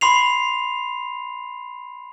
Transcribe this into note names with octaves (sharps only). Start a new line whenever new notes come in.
B5 C6 C7 F7